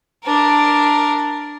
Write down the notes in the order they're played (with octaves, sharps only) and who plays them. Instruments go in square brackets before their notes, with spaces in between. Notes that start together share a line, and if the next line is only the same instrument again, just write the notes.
[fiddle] D4 A#4